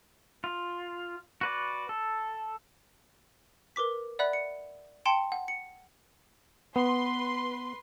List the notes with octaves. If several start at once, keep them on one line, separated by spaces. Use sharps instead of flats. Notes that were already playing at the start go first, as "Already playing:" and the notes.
F4
F#4 B4 D5
A4
A#4 B4 D6 B6
D5 E5 F#5 B5 F#6
C#7
G5 A5 C6 C#7 D7 E7
F#5
C#7
B3 B4 C6